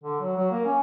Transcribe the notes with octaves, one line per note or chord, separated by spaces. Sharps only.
D3
F#3
F#3
A#3
C#4